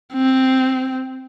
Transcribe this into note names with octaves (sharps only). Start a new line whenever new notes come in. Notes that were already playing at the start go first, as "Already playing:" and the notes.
C4